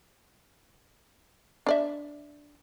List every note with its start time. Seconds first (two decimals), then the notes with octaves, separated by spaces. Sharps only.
1.66 D4 D5 E5